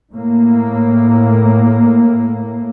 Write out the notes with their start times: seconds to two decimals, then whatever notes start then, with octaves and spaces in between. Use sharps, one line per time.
0.13 A2 A#3